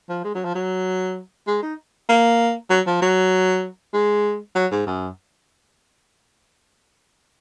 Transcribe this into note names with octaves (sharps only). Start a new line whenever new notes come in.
F3
G#3
F#3
F3
F#3
G#3
D#4
A#3
F#3
F3
F#3
G#3
F#3
G#2
F#2